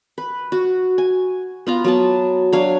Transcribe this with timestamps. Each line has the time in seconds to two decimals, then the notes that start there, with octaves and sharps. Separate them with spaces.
0.18 B4
0.52 F#4
0.98 G#5
1.67 B3 F4 A#5
1.84 F#3 B3 A5
2.53 F#3 D4 C#5 F5